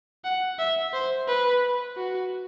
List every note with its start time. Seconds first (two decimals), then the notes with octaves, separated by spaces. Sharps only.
0.25 F#5
0.59 E5
0.93 C5
1.28 B4
1.97 F#4